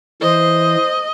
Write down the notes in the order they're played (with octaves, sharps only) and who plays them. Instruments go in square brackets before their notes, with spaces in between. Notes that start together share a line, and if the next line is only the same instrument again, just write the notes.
[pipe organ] E3 [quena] C5 [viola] D#5